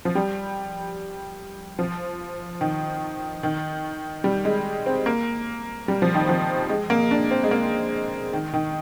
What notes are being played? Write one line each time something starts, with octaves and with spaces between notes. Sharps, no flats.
F3
G3
F3
D#3
D#3
G3
G#3
C4
A#3
G3
F3
D#3
F3
G#3
A#3
D4
C4
G#3
A#3
D#3
D#3